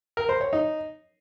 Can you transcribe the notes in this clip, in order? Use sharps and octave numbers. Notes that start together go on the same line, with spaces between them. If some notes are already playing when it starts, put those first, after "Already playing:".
A#4
C5
C#5
D#4